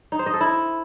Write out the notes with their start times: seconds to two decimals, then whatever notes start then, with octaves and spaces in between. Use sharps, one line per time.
0.12 D#4
0.19 C5
0.26 D#5
0.33 A4
0.41 E4